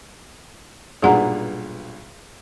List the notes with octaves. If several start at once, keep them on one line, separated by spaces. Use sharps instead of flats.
B1 G2 A#2 G#4 F#5 A#5